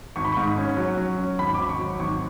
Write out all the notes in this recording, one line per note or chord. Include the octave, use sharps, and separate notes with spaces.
G#1 C#6
B5
G#2 C#6
C#4
F#3
F#3
C#4
G#1 B5
G#1 D6
C#6
F#3
G#1 C#6